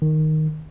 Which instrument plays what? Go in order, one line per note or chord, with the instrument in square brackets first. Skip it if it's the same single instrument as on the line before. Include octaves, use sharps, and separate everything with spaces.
[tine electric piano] D#3